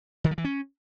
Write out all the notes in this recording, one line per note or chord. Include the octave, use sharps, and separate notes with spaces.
D#3
F3
E3
C#4